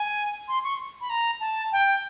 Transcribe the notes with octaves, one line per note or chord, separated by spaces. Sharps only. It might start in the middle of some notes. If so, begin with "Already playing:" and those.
Already playing: G#5
C6
C#6
B5
A#5
A5
G5